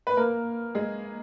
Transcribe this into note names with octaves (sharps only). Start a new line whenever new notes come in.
B4
A#3 A#4
G#3 G#4